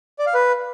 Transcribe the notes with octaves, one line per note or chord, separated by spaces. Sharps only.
D5
F5
B4